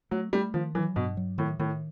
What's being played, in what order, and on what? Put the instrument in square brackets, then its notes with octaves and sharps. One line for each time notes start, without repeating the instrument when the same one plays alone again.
[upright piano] F#3 [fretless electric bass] A3
[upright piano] G3 [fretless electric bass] A3
[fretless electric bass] D#3 [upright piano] F3
[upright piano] E3 [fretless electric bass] F#3
[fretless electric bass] G2 [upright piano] B2
[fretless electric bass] F#3
[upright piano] A2 [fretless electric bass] D#3
[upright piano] A2 [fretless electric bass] D#3